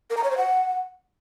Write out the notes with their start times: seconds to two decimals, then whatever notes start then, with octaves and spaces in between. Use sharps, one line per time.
0.10 A#4
0.17 A#5
0.24 C#5
0.31 C5
0.38 F#5